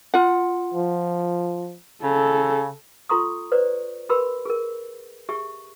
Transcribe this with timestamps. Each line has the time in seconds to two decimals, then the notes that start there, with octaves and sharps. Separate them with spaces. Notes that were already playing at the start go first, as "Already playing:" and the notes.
0.14 F4 F#5
0.74 F3
2.04 C#3 A4
3.09 F4 A4 A#5 C6 C#6 D#6
3.52 B4 C5 D5
4.09 G4 A#4 B4 B5 C6 E6
4.46 G#4 A#4
5.29 G4 G#4 E5 C#6